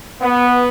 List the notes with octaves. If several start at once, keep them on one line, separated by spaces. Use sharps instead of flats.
B3